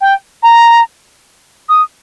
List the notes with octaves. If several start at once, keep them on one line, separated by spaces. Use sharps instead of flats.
G5
A#5
D#6